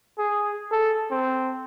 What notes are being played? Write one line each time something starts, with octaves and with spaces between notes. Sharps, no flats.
G#4
A4
C4